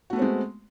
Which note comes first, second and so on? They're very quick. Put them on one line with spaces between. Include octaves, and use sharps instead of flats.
F#4 A3 B3 C4 G#3